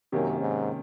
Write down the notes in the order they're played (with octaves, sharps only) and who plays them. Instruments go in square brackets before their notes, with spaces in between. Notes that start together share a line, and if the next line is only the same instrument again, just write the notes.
[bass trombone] F#2 [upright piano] C3 D#3 A#3 C#4
[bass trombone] G#2